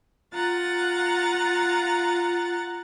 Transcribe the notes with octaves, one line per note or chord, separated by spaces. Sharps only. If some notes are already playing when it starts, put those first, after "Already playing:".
F4 F#5 A#5 A6